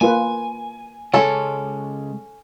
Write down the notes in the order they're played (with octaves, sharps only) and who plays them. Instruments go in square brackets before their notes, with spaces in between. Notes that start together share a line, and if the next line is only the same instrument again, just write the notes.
[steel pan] A#3 F4 B4 [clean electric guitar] G#5
[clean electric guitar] C#3 G#3 [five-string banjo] C#4 A4